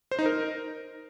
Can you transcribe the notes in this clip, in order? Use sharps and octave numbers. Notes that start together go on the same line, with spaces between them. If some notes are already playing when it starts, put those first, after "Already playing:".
C5
D#4
A#4